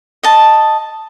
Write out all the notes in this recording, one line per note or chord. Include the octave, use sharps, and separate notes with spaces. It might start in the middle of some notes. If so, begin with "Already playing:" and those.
D#5 A5